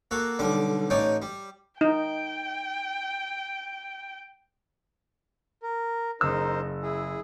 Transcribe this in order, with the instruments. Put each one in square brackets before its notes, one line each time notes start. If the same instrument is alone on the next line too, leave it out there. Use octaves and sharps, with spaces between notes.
[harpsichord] A#3 F#4 A4
B1 D3 G3 D6
A1 D#4 C#5 D5 G5
G3
[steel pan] D#4 [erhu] G5
[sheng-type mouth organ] A#4
[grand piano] F#1 E6 [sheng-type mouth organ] D#4 A#4 C5
[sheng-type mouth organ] E4 G#4